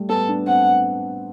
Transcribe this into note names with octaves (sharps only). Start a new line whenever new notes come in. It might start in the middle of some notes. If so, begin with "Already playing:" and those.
Already playing: G3 A3
B3 A4
D4
C4 F#5